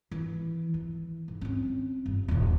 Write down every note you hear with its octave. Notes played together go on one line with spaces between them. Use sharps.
E3
E3
G#2
C4 C#4
G1
D#1 E2